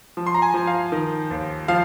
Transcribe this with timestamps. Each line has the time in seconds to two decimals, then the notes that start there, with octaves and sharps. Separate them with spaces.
0.17 F3
0.26 C6
0.34 A#5
0.42 G#5
0.54 F3
0.67 F5
0.92 D#3
1.31 D#2
1.68 F3 F5